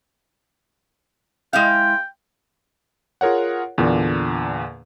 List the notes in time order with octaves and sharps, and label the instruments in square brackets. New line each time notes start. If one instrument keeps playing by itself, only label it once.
[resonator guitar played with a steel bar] G#3 E4 F5 [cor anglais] G5
[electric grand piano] F4 G#4 A#4 C#5 F#5
E2 A#2 D3 A#3 D4